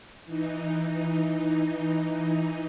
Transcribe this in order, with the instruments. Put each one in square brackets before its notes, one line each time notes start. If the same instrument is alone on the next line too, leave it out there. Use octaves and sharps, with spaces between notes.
[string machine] E3 D#4